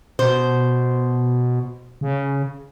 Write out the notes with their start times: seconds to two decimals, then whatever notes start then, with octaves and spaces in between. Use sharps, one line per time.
0.19 B2 C5
2.01 C#3